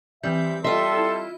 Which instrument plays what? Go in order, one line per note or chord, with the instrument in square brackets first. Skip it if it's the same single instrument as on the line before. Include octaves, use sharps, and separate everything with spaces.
[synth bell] E3 C4 G6 [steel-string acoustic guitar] G3 [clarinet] E5
[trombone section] G3 A4 [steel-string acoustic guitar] F4 E5 [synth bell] D#5 [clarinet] C6
[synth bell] E4